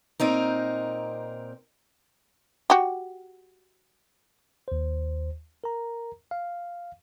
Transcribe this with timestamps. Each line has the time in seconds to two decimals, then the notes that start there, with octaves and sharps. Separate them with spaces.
0.20 A#2 C4 D#4 A#4
2.70 F#4 G4
4.68 D#2 C5
5.64 A#4 A#5
6.31 F5